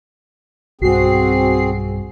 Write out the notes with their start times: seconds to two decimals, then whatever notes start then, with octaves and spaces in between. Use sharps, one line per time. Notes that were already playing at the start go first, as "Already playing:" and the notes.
0.81 B1 G2 C4 F#4 G#4 C7